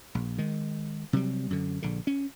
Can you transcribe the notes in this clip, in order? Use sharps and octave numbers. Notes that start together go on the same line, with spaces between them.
A#1
D#3 G#3
C3 F#3 G3
F#2 D3
A#1 D3
C#4